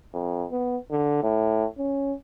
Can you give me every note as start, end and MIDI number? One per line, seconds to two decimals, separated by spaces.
0.14 0.46 41
0.51 0.77 59
0.91 1.22 50
1.23 1.66 45
1.78 2.13 61